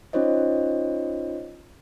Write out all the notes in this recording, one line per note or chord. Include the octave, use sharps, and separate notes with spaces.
C#4 D#4 F4 C5 C#5 D#5